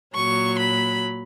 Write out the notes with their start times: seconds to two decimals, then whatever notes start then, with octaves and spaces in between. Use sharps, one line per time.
0.15 A#2 F#3 C#6
0.59 B5